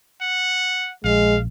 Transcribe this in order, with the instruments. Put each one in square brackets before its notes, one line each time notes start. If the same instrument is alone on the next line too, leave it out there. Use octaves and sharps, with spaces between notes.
[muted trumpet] F#5
[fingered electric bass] A#1 [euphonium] G#3 [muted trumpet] F5